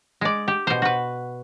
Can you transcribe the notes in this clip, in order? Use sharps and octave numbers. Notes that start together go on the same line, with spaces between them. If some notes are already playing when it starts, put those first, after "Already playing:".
G#3 D5
G4
B2 C5
F#4 B4